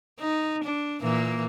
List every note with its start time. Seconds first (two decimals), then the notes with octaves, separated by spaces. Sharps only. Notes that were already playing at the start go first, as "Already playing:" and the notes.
0.20 D#4
0.64 D4
1.02 A#2 E3 A#3